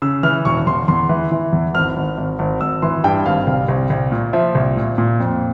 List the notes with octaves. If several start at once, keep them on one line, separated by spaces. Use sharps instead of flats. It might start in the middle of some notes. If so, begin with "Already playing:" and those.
C#3 E6
E3 F6
E1 C#6
E2 C6
E2 C6
E3
E3
E2
G#1 F6
G#1
G#1
G#1
G#1 E6
E3 C6
G2 G5
G#1 F5
C2 F5
C2
C2
A#2
F3 E5
C2
A#2
A#2
F2